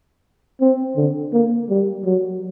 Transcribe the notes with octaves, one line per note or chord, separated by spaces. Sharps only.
C4
D3
A#3
G3
F#3